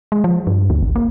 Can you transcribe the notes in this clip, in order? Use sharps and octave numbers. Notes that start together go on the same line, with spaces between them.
G#3
F3
G2
D2
G#1
A#3